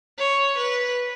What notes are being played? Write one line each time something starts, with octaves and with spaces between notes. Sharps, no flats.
C#5
B4